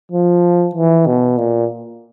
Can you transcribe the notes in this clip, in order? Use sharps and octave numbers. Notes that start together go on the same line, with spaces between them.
F3
E3
B2
A#2